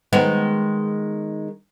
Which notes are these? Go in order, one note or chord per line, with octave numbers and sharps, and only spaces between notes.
D#3 G#3 B3